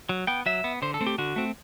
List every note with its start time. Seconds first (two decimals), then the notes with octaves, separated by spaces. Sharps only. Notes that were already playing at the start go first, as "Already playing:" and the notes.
0.09 F#3
0.27 B3 G5
0.46 F#3 E5
0.64 B3
0.82 D3 C5
0.94 A4
1.01 A3 C4
1.07 G4
1.18 D3 F#4
1.36 A3 C4